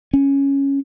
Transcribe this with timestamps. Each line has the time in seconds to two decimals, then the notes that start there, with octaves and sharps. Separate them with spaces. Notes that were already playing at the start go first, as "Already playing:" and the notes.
0.13 C#4